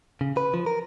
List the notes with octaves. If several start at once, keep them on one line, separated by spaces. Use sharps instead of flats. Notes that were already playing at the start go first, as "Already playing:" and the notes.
C#3
B4
F3
A#4